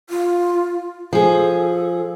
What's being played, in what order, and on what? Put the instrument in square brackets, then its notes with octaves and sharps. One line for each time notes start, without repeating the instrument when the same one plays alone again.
[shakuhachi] F4
[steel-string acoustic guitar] F3 G#4 [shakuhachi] A4